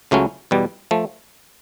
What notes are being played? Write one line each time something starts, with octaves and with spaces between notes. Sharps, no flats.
C#2 C#3 F#3 A3 C#4
E2 B2 G3
F3 A3